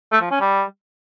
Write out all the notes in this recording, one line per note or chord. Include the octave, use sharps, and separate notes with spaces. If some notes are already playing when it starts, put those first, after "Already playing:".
A3
F3
C#4
G3